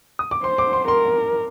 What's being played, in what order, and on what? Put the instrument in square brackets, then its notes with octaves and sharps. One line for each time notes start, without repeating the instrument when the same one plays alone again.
[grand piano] D#6
D6
[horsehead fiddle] C5 [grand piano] C6
[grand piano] D6
C6
[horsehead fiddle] A#4 [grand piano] C6